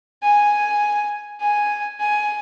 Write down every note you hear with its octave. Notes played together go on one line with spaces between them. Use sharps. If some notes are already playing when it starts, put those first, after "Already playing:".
G#5
G#5
G#5